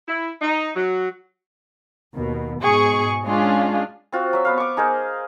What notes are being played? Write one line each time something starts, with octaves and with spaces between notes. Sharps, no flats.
E4
D#4
F#3
D#2 B2
G#2 B2 G#4 C#6
G#3 C#4 D4 F4 G#4
C4 F4 F#4
F#3 E5
B3 B4 F5
C#6 D6
D#4 G#4 A#4 C5